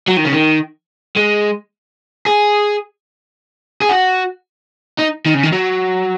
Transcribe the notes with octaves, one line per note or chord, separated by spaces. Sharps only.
F#3
D#3
C#3
D#3
G#3
G#4
G#4
F#4
D#4
D#3
C#3
D#3
F#3